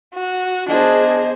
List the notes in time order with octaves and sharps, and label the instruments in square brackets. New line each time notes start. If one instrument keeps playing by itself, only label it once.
[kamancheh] F#4
[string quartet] B3 C5 [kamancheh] D4 [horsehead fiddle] G#4 [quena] D#5